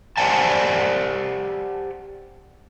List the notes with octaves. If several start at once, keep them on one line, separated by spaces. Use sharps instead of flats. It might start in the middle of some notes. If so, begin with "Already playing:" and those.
G4 C5 D5 F#5 G#5 A5